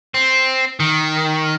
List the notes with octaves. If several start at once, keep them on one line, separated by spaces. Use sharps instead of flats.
C4
D#3